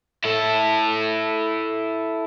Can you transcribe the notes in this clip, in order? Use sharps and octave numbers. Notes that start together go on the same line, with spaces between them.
E4 A4